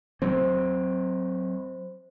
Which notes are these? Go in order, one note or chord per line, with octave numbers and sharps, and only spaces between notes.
F#3 C4 C5